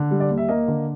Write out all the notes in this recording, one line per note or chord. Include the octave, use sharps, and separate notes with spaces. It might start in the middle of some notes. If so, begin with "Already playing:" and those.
Already playing: D3
G3
D5
D#2
E5
A#3 D#5
D3